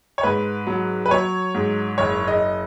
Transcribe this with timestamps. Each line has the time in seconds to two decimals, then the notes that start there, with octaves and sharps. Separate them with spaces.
0.18 C#5
0.23 G#2 B4
0.67 F#3
1.06 B4
1.11 F#3 C#5
1.54 G#2
1.98 F#1 C#5
2.28 D#5